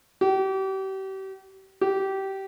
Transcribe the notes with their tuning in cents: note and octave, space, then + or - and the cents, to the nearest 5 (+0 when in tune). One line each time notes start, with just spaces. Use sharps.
G4 -35
G4 -20